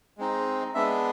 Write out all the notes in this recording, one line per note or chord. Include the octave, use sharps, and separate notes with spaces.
G#3 C4 D#4
G#3 B3 D4 E5